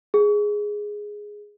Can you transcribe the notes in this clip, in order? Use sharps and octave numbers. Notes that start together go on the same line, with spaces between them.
G#4